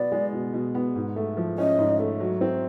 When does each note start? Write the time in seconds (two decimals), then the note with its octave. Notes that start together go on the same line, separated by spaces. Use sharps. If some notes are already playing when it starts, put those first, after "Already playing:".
Already playing: B2 B3 D5
0.12 G#3
0.33 B2
0.54 B2
0.75 B3
0.95 G#2
1.16 A3
1.37 F3
1.58 C#4 D#5
1.78 G#2
1.99 A3
2.20 F#3
2.41 C4